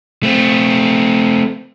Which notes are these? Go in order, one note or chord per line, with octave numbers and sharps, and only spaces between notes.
A3 C4